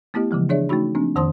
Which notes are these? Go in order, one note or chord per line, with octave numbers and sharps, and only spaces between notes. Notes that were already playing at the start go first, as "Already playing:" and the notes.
A3 B3 E4 G4 D#5
C#3 E3 F3 G#3
D4 G#4 C#5 D5 E5
A3 C#4 D#4 F#4 B5
F3 A#3 C4 D4
F2 D#3 C5 A5 C6 D#6